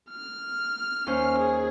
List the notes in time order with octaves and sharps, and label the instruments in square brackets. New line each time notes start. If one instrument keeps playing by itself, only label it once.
[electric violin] F6
[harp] D#2 C#4 C5
[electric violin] G#4